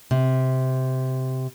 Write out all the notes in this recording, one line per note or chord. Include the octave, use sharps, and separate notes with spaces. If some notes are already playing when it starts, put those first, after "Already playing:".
C3